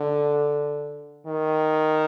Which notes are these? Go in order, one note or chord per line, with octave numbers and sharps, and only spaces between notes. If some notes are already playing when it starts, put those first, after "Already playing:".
Already playing: D3
D#3